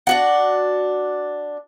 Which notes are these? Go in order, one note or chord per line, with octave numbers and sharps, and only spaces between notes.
D4 F#4 F#5